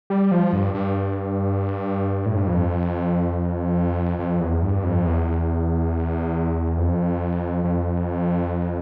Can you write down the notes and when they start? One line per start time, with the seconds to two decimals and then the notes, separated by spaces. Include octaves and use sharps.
0.10 G3
0.32 F3
0.53 G2
0.74 G2
2.26 A2
2.36 G2
2.47 F2
4.19 F2
4.41 E2
4.62 G2
4.84 F2
5.06 E2
6.78 F2
7.64 F2